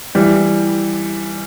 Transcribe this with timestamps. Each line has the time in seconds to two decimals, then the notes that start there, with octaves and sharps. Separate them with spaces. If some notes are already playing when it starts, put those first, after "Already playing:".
0.15 E3 G3